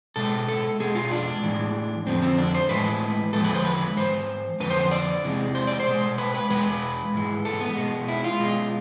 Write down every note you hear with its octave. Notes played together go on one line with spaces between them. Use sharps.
B2 G#3 A4
A4
B2 G#3 G#4
F4
D4
A2 E3 G#3
F2 D3 F3 C4
C4
D4
C5
A2 E3 G#3 B4
E2 D3 F3 G#3 A4
B4
C5
B4
G#2 E3 C5
F2 D3 F3 B4
C5
C5
D5
E2 C3 E3 G#3
C5
D5
C5
B2 G#3
B4
B4
E2 B2 G#3 B4
G#2 E3 G#3
A4
B3
B2 G#3
E4
F4
B2 G#3